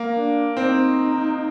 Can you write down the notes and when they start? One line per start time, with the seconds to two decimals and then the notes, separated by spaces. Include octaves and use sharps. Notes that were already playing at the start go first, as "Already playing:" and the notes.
Already playing: A#3
0.16 D4
0.57 C4 D#4